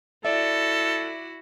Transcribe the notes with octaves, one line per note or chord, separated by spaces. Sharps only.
E4 F#4 A4 D5 E5